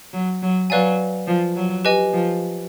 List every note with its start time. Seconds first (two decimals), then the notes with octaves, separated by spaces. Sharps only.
0.13 F#3
0.42 F#3
0.70 F#3 B4 D5 F5 G#5
1.27 F3
1.56 F#3
1.85 G4 B4 D#5 G#5
2.13 F3